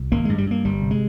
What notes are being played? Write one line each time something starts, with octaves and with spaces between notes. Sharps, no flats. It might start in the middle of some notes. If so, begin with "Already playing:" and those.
Already playing: C2
G#1 A#3
G2 G#3
G3
G2 A#3
G1 G3
C3
G#3